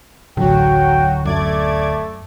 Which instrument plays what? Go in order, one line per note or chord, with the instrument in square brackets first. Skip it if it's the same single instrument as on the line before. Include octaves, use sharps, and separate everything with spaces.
[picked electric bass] D1 D3 [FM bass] A1 [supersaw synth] F#3 F#4 [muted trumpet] G5
[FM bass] F#2 [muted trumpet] A3 [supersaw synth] D5 D6 G#6